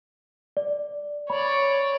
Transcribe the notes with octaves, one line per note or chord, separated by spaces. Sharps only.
D5
C#5 D5 B5